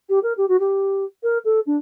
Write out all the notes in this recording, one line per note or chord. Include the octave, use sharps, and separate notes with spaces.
G4
A#4
G4
F#4
G4
A#4
A4
D4